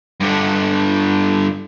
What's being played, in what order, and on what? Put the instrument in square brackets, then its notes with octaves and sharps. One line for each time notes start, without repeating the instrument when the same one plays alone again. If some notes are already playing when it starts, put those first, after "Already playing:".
[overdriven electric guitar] G2 D3